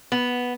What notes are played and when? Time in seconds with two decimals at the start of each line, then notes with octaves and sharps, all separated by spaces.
0.12 B3